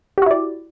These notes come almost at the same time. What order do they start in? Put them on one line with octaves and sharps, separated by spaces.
G4 F#4 E4 D5